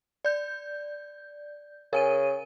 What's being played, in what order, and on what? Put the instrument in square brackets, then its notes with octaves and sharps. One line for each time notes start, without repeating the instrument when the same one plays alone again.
[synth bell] D5 G6
[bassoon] C#3 [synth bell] A#4 G#5 D#7